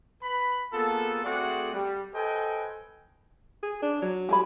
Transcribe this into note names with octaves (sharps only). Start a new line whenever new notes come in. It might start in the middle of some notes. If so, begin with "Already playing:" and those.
B4 B5
A#3 B3 F4 G#4 A4
A3 C4 F#4 G#4 D5 F#5
G3
A4 B4 C5 D#5 G5 G#5
G#4
D4
F#3
G4 G#4 B5